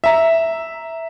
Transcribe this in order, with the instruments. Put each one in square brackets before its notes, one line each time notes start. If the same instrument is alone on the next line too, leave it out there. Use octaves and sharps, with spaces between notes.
[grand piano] E5 A#5